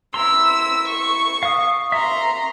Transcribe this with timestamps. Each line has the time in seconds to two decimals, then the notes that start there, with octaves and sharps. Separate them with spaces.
0.14 E4 A#5 C6 E6
0.88 C#6
1.43 F5 D#6
1.92 E5 A#5 C6 C#6